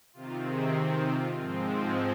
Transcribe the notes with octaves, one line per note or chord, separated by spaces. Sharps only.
C3 D#3 C4 F4
G#4
F4
G#2 F3 G#3 C4